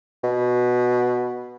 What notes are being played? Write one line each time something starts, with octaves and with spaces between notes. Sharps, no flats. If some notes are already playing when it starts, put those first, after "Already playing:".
B2